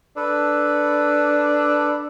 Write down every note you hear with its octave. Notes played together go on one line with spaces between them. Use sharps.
D4 A4 B4